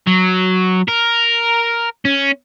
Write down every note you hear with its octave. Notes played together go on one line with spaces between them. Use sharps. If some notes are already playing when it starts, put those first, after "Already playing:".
F#3
A#4
C#4